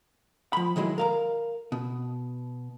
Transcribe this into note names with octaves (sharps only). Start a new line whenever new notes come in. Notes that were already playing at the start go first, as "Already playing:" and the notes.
F3 B5
D#3 F#3 G#3 E4
A#4 F5 A#5
B2